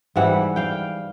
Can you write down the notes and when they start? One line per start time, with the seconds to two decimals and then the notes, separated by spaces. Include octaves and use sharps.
0.16 G#2 E3 G3 E5 F#5
0.56 F5 G5